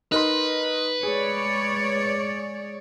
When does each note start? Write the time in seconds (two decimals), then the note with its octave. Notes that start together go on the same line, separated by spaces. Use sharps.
0.12 D#4 A#4 B4 C6
1.03 G#3 G#4 C#5 D5